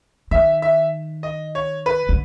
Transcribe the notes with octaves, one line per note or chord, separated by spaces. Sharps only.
D#3 E5
E5
D#5
C#5
B4
D3